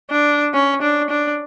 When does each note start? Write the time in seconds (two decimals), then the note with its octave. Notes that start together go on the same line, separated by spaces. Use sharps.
0.11 D4
0.54 C#4
0.82 D4
1.10 D4